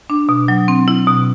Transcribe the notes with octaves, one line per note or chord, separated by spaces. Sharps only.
D4
B2
F#3
C4
E4
B2